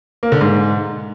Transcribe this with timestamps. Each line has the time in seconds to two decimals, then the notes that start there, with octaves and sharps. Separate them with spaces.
0.23 A#3
0.32 D3
0.41 G#2